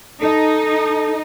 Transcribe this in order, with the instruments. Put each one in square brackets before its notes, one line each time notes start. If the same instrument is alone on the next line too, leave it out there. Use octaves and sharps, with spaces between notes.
[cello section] D#4 [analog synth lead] A4